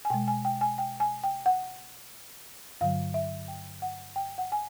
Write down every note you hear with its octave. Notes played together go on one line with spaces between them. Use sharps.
G#5
B2 G#3 G5
G#5
G5
G#5
G5
G#5
G5
F#5
G2 D3 F#3 F5
E5
G5
F#5
G5
F#5
G#5